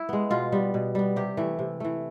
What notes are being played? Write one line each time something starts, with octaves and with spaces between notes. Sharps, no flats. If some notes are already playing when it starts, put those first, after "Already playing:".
Already playing: E4
G#3 B3
B2 F4
G3 B3
B2
G3 B3
C3 G4
E3 A3
C3
E3 A3